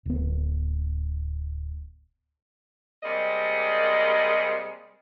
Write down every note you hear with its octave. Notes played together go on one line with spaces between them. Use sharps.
D1 B3
C3 G3 G#3 A#3 D5 D#5